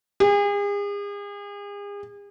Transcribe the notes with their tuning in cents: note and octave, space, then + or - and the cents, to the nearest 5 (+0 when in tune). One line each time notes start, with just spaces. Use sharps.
G#4 -40